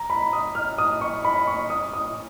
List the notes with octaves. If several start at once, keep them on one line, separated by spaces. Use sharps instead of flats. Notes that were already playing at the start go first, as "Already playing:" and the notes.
Already playing: A#5
B5
D#6
F6
D#6
C#6
B5
C#6
D#6
D#6